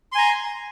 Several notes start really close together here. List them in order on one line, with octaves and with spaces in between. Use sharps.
C6 G#5 A#5